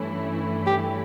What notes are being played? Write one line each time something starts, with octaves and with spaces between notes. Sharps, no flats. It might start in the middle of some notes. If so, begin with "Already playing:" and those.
Already playing: G2 E3 A3 C#4 E4
G4